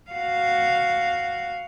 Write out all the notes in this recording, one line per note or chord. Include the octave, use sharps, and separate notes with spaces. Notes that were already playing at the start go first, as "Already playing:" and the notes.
F#4 F5